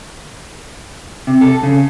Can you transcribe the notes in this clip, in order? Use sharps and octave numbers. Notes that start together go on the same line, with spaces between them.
C3
A4
C#3